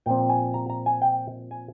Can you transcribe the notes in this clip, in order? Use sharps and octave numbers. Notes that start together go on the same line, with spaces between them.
A#2 F3 C4 G5
G#5
A#5
A#5
G#5
G5
G#5